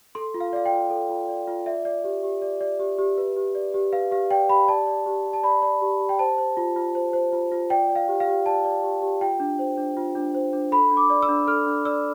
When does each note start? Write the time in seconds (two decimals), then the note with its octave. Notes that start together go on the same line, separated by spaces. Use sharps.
0.15 A4 C6
0.34 F4
0.40 F5
0.53 D5 F5
0.66 G5
0.72 F4
0.90 A4
1.10 F4
1.28 D5
1.47 F4
1.66 D5 E5
1.85 D5
2.04 G4
2.23 G4
2.42 D5
2.61 D5
2.80 G4
2.98 G4
3.17 B4
3.36 G4
3.55 D5
3.74 G4
3.93 B4 F5
4.11 G4 F5
4.31 D5 G5
4.49 G4 B5
4.68 D5 A5
4.87 D5
5.06 G4
5.25 G4
5.33 A5
5.43 D5 B5
5.62 D5
5.81 G4
6.00 G4
6.09 G5
6.19 C5 A5
6.38 C5
6.57 F4
6.76 F4
6.95 C5
7.13 C5
7.33 F4
7.52 F4
7.70 D5 G5
7.89 D5
7.96 F5
8.08 G4
8.20 F5
8.27 G4
8.46 D5 A5
8.65 D5
8.83 G4
9.02 G4
9.21 F4 G5
9.40 D4
9.59 C5
9.78 D4
9.97 F4
10.15 D4
10.35 C5
10.53 D4
10.72 A4 B5
10.91 D4
10.97 D6
11.10 D5
11.22 E6
11.29 D4
11.47 A4 F6
11.67 D4
11.85 D5 E6